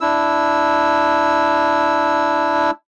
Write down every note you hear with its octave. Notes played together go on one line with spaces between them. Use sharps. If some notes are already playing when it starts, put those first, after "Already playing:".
D4 E4 E6